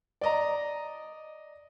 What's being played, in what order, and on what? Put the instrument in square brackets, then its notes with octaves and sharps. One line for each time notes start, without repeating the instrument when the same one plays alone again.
[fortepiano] D5 D#5 A#5